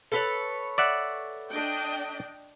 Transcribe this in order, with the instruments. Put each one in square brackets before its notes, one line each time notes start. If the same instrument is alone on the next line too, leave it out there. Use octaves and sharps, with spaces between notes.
[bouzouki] A4 B4 C#5
[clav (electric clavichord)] D5 E5 F#5
[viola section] D4 D#5 G5